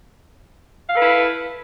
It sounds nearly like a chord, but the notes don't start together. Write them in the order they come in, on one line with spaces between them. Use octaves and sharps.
F5 A4 B4 E4